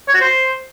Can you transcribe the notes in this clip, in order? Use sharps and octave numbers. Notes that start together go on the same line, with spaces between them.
C#5
F#4
C5